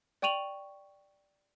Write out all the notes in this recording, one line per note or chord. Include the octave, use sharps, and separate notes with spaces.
D5 G5 C#6 D#7 F7 F#7